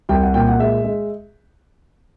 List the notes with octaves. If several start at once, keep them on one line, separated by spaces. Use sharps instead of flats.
C2 G5
F#5
A#2 G5
F#5
G#3 E5
G#3